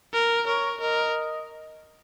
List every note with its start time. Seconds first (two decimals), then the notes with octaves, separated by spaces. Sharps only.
0.13 A#4
0.47 A#4 C#5
0.81 A#4 D#5